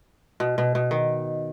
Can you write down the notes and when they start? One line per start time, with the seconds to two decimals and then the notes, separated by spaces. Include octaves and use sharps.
0.40 B2
0.58 B2
0.75 B2
0.91 D#3